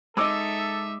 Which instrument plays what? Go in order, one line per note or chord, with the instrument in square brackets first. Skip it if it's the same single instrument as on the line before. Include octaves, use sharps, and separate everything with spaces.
[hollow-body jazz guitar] G#3 C#5 D#5 [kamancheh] D#4 E5 [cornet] A4 [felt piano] D6 E6